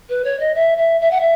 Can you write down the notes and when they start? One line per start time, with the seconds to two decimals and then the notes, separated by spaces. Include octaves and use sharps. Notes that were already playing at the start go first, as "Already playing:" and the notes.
0.09 B4
0.24 C#5
0.39 D#5
0.55 E5
0.77 E5
1.01 E5
1.11 F#5
1.21 E5